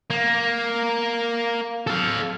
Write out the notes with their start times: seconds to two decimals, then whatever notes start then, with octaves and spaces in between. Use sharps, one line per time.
0.10 A#3
1.87 A4 F5